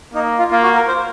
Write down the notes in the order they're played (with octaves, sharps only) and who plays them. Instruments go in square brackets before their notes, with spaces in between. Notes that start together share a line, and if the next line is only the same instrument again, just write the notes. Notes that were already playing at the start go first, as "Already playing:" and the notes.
[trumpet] A#3 [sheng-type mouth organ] D#4
[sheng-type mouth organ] F4
[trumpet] A#3 [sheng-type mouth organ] F4
[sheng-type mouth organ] F#4
A#4
C5